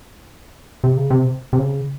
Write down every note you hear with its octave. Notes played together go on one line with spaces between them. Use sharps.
C3
C#3
C3
C3
C#3